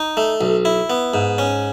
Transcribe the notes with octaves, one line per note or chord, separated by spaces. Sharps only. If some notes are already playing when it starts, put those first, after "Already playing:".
Already playing: D#4
A3
B1
E4
B3
G#2
C#4